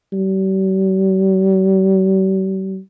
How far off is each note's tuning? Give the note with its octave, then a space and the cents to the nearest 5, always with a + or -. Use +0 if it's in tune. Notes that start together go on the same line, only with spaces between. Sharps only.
G3 -45